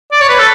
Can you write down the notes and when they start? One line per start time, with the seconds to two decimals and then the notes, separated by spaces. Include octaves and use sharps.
0.12 D5
0.21 C#5
0.29 B4
0.39 A4